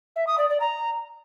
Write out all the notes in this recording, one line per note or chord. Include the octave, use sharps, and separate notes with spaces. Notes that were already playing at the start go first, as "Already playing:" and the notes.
E5
D#6
D5
D5
A#5